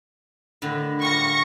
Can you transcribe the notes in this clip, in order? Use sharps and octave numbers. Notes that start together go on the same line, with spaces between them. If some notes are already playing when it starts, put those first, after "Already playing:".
A2 D3 D#3
G3 F4 C#6 A#6 C#7